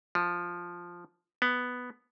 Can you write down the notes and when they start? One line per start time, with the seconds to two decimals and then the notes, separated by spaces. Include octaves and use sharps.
0.15 F3
1.42 B3